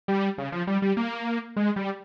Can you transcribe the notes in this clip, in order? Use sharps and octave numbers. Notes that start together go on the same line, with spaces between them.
G3
C#3
F3
G3
G3
A#3
G#3
G3